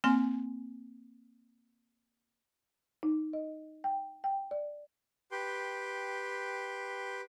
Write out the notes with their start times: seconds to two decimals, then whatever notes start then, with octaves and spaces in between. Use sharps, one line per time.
0.04 A#3 C4 G#5 C6
3.03 D#4
3.33 D#5
3.84 G5
4.24 G5
4.51 D5
5.32 G4 B4 G5 C6